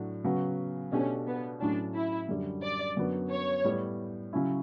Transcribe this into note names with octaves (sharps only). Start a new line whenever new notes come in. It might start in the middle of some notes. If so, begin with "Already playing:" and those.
Already playing: A2 F#3 A3 D4 F#4
C#3 F#3 B3 F#4
B2 A3 C#4 D4 G4
B3
A2 F#3 C#4 D4
E4
F#2 D3 G3
D5
F#2 D3 F#3 B3
C#5
A2 G3 B3
C#3 F#3 C#4 E4